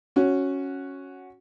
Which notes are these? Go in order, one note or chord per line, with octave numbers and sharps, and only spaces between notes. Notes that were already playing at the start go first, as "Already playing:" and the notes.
C#4 F#4